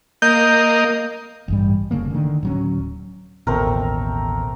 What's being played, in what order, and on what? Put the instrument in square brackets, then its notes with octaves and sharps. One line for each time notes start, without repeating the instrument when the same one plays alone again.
[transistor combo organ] A#3 D#5 [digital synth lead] G6
[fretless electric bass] A1 G2 G3
F1 C#3 A3 A#3
D3 D#3
D1 F#3 C#4
[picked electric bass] A1 D#2 B2 [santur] A3 C4 A#4